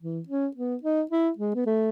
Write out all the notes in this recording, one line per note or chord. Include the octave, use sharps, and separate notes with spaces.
E3
C#4
B3
D#4
E4
G#3
B3
A3